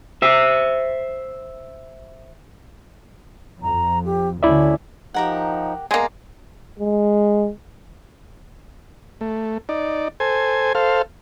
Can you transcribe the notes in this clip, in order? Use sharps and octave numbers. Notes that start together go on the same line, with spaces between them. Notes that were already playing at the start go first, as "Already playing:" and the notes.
C5 E5
F2 A#5
G4
D2 D3 C#4 E4 D5 E5
F3 D#4 G4 A#4 F#5
G#3 A#3 B3 D5 A#5
G#3
A3
D#4 D5
A4 C5 G#5
A4 C5 F5